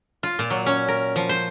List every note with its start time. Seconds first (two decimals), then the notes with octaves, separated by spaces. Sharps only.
0.23 F4
0.39 A#2
0.50 F#3
0.66 C#4
0.88 A#4
1.16 F3
1.29 C5